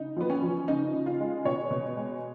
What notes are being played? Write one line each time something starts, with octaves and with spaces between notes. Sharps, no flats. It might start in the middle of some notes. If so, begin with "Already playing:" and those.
Already playing: C#3 D#4
F3 B3
C#4
F3
C#3 D#4
C#3
F4
G#3
B2 C#5
B2
G#3